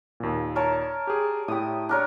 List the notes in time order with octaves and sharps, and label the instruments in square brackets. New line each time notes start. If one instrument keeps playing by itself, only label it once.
[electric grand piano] D#2 A#2
[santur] A#4 C#5 A5
[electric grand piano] G4 G#4
[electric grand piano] A2 E4 [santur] G4 D#6
[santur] D4 A#4 C#5